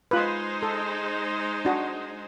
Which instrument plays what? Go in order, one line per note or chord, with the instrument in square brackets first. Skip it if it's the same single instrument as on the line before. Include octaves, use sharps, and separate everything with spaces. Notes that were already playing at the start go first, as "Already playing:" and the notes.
[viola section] G#3 D#4 C5 [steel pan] F4 B4
[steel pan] A4
D4 F#4